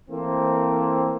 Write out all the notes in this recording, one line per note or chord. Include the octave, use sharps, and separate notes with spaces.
E3 A3 A#3 C4